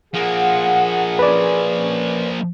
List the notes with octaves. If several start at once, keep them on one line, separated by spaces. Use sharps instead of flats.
F3 A#3 G#4 F#5
C#4 B4 D5
C#4